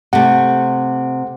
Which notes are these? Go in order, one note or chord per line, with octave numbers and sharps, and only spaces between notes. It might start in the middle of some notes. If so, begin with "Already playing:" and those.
C3 A3 F#5